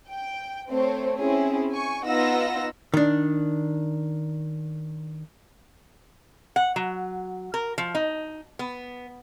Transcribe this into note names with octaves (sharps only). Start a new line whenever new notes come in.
G5
A3 C4 C5 C#5
C4 C#4 E4 G#4
G#5 C#6
B3 D#4 F4 F#5 E6 A#6
D#3 D4
F#5
F#3
A#4
F3
D#4
B3